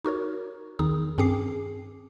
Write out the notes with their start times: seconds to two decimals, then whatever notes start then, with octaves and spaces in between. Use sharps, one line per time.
0.05 D#4 F#4 A#4 C#5
0.79 E2 D#3 D#4 G#4 D#6
1.18 G2 C4 C#4 G#4 D6 C7